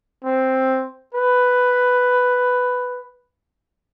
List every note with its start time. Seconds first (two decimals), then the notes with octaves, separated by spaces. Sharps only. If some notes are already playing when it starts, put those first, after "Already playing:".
0.25 C4
1.15 B4